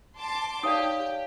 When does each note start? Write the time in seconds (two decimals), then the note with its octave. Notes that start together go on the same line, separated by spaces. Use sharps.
0.18 A5 C6 D6
0.63 D#4 G4 C#5 D5 F5 G5 A5 D#6